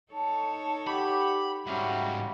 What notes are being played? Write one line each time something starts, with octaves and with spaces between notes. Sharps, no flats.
D#4 A4 C#5 A5
G4 F#5 B5
G#2 G3 C#4 F#4 E5 F5